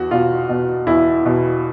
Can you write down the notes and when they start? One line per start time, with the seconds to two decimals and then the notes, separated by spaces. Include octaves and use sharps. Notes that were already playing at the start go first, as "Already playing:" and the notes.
Already playing: E2 F#4
0.11 B2 F4
0.49 B2
0.87 E2 E4
1.25 B2